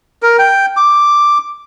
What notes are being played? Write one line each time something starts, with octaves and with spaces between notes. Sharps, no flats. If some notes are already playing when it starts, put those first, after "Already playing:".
A#4
G5
D6